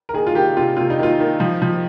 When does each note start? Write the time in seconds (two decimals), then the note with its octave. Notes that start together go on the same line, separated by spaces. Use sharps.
0.09 A#4
0.14 D#3 G#4
0.27 F4
0.34 D#3 G4
0.57 C3 F4
0.77 C3 F4
0.90 D#4
0.99 D#3 F4
1.20 D#3
1.40 F3
1.62 F3